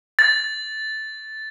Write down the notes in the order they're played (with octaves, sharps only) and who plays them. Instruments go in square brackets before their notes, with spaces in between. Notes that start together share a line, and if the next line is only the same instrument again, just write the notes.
[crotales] A6